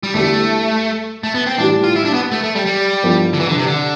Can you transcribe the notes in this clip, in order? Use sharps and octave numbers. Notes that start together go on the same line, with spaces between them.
G3
E2 D3 G3 A3
A3
B3
C4
A2 E3 G3 D4
F4
E4
D4
B3
A3
A3
G3
G3
G2 F3 B3 E4 A4
D3
E3
D3
C3
D3